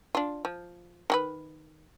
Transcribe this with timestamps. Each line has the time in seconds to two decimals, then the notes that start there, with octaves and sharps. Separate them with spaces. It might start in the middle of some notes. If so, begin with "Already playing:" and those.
0.15 D4 F4
0.45 F3
1.10 D#3 F#4 B4